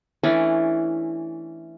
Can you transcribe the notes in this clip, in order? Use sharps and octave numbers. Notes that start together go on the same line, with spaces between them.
E3 A3 C#4 D4